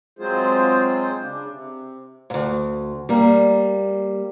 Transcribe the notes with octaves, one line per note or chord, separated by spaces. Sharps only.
F#3 G#3 C4 F4 G#4 C5
C#3 D4
C3
D2 G#2
G3 A#3